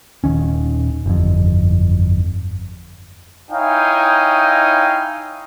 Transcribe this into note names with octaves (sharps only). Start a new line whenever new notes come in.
D#1 C#2 D#3 C#4
G1 F2
D#4 E4 C#5 F5 G5 G#5